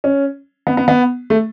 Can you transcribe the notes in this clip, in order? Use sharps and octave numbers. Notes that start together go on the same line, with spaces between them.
C#4
B3
B3
B3
A3